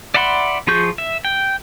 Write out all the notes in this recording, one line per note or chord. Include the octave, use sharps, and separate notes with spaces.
D5 E5 F#5 B5 C6
F3 F4 G#4 C#6 G6
E5
G5